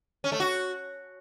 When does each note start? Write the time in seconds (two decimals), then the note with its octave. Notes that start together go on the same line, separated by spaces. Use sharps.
0.24 C#4
0.32 A3
0.40 F#4